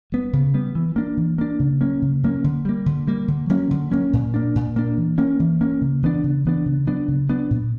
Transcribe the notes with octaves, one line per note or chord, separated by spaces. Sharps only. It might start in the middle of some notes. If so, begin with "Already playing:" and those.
G3 B3
C#3
G3 B3
E3
A#3 D4
E3
A#3 D4
C#3
F#3 A#3 C#4
C#3
F#3 A#3 C#4
D3
G3 A#3
D3
G3 A#3
D3
F#3 A#3 C#4
D3
F#3 A#3 C#4
A#2
A#3 D4
A#2
A#3 D4
E3
A#3 C#4
E3
A#3 C#4
C#3
E3 B3 D4
C#3
E3 B3 D4
C#3
F#3 B3 D4
C#3
F#3 B3 D4
A#2